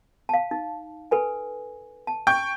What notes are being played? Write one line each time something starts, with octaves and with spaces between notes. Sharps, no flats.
F5 A5
D#4
A4 B4 G#5
A5
G5 C#6 G6